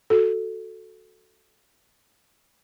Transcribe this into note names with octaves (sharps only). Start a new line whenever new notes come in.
F#4 A4